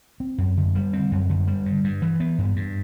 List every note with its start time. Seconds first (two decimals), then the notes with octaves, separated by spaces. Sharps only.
0.20 C4
0.38 F#2
0.57 D3
0.75 G3
0.93 C4
1.12 F#2
1.29 D3
1.47 G3
1.66 G2
1.84 G2
2.02 E3
2.20 B3
2.38 G2
2.56 G2